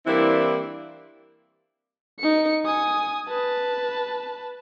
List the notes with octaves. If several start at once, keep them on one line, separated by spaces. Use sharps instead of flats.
E3 G3 A#3 C4 D4 E4
D#4 C#7
G#5 D#6
B4 A5